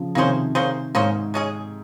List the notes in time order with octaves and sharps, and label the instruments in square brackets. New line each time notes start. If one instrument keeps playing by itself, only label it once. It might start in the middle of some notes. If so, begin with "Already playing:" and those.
Already playing: [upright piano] C#3 F3
[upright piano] C3 D#3 [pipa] A#3 C#4 G#4 C5
[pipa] A#3 C#4 G#4 C5
[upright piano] G#2 [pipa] A#3 C#4 G#4 C5
[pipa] G#3 C#4 G#4